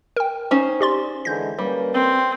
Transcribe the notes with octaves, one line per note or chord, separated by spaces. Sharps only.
A#4 G5
C#4 D#4 C5
G4 D5 C6
D3 E3 G#3 G6 A#6
G3 A#3 C#4 B4
C4